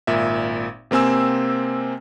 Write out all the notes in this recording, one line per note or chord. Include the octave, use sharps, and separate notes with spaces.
G#1 A#2 E5
C3 A#3 C4 G#5 E6